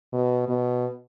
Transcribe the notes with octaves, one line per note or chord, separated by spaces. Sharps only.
B2
B2